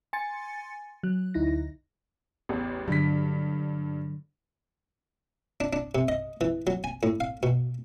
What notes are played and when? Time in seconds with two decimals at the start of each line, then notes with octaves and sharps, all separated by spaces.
0.13 G#5 C6 A6 C#7
1.03 F#3 F#6
1.34 D2 D#4 E4 A#6
2.49 A1 E2
2.88 G2 D3 F#3 B6
5.60 D4
5.73 D4
5.95 C3
6.08 D#5
6.41 E3
6.67 F#3
6.84 G#5
7.03 A2
7.20 F5
7.43 B2